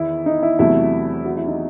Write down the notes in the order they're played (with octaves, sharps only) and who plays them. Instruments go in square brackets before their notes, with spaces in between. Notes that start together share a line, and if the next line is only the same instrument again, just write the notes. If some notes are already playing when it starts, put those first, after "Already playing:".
Already playing: [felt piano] E2 D#3 [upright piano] E4
[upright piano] D#4
E4
[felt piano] E2 C3 F#3 A3 [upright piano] E4
[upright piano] F#4
E4
D#4